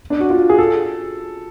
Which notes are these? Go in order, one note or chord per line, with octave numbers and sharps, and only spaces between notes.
D4
F#4
F4
G#4
A4